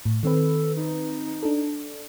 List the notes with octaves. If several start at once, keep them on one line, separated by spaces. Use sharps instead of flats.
A2
D#3 C4 A4 B4
D#4
D4 A4